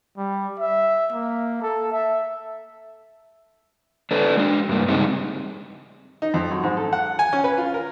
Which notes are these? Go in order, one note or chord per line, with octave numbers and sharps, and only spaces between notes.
G3
E5
A#3
A4
E5
D4 A4 B4
G#3 D4
G2 A#3
C#3 G3 G#3 C4 D#4
D#4
F2
F#2
G#2
A4
F#5
G#5
C#4
B4
F4
A#4